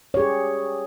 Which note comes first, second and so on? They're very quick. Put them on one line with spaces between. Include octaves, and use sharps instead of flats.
C#5 G4 G#4